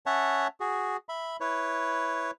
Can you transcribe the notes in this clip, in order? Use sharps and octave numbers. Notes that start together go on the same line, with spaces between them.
C#4 C#5 E5 F#5 A5
F#4 G#4
E5 B5
E4 B4 C#5